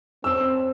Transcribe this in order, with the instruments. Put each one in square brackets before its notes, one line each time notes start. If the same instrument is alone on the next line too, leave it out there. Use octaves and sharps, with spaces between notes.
[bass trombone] C4 [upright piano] E6